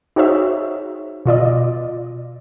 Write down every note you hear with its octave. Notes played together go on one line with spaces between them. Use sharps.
D#4 F#4 G#4 C5 C#5 E5
B2 F4 D5 D#5